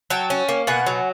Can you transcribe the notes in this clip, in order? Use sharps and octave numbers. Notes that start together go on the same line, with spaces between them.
F#3 G5 A5
C#4
A#3
B2 F#5 G#5
F#3